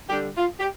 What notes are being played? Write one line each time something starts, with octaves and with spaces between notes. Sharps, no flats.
D3 G3 D4 G4
F4
G4